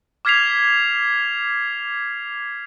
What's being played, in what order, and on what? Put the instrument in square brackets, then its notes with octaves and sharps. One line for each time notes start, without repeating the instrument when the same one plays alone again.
[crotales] D6 F6 G#6 B6 C7 F7